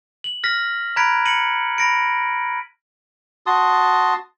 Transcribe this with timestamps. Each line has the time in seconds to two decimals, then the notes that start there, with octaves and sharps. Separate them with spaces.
0.24 F#7
0.44 F6 A#6 B6
0.96 A#5 B5 F#6 G#6 B6 D7
1.25 A#6 C#7 D#7 F#7
1.78 B5 A#6 D7
3.46 F#4 A5 C6 D#6